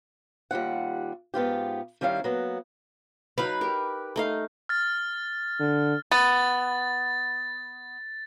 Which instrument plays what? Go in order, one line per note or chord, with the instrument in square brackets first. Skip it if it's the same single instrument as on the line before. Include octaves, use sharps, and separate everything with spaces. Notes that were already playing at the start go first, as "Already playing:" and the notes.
[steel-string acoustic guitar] D#2 G3 F4 F#5
G#2 B3 F4 G4
D#3 G3 C#4 E4 F5
F#3 A#3 B3
[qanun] F#3 D#4 F5 [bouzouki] B4
[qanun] G4 A#4
A3 D#4 F5
[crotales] F6 A6
[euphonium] D3
[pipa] B3 [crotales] A6